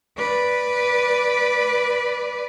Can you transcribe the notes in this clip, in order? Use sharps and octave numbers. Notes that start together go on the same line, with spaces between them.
B4 D5